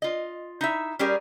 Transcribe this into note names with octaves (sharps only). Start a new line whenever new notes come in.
F4 D#5
D#4 E4 E5
G3 C#4 G4 G#4 A#4 D5